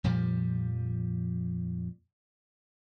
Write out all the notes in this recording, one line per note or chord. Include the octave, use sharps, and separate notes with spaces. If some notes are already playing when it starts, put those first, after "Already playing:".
F2 A#2 F3 G3